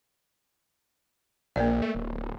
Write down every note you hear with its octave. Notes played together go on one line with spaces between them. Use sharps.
A#1 A#3 A#4 D5
A3
D1